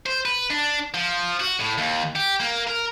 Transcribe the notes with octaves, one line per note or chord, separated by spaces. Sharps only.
C5
B4
D4
F3
F#4
A2
D#2
G4
A#3
A#4